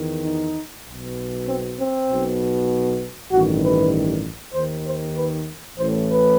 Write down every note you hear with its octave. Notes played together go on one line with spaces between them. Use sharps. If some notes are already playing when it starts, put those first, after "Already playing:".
Already playing: E2 D#3
D#4
B1 B2
C4
C4
B1 B2
A1 G2 D#3 F#4
B4
D#2 D#3 C5
C5
B4
A1 A2 E3 C5
B4